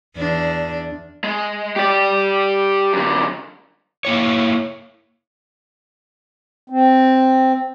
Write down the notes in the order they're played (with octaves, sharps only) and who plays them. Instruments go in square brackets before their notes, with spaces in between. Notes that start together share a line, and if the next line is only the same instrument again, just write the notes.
[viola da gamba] E2 D4
[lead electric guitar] G#3
G4 D5
F#2 D3
[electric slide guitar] A#3 E4 C#5
[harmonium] C4